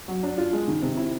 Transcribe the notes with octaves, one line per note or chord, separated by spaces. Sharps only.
F#3
D4
F4
G#3
D#3
C3
E4